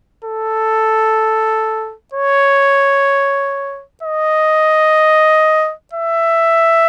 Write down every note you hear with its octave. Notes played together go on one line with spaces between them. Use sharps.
A4
C#5
D#5
E5